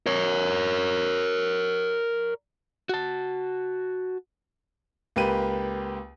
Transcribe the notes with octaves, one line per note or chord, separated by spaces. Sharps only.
A#4 C#5
F#4 A5
C#2 A#3 G4 B4 D#7